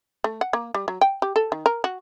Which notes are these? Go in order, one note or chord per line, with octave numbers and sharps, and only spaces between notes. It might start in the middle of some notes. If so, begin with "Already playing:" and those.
A3
F#5
A#3
G3
F#3
G5
G4
A4
D#3
A#4
F#4